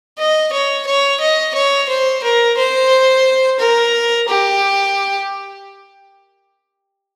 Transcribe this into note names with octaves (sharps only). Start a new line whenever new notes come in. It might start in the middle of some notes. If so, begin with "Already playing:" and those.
D#5
C#5
C#5
D#5
C#5
C5
A#4
C5
A#4
G4